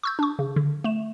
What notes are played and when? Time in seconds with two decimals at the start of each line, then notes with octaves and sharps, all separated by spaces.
0.03 C#6 E6 G6
0.19 D4 C#6
0.39 C#3
0.56 D3
0.84 A3 E7